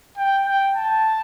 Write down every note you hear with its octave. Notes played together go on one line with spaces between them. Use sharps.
G5
G5
A5